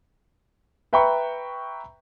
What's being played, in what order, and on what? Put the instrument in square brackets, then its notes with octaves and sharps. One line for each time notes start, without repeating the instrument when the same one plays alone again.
[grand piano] B4 E5 G5 A#5 B5 C#6